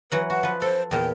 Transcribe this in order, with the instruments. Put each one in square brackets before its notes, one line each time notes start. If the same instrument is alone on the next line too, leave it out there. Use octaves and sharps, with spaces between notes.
[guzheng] E3 F#3 F#5 [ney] B4
[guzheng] F#4 [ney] F#5
[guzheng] F3 B4
[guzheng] A4 [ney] C5
[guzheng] E2 A#2 [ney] G5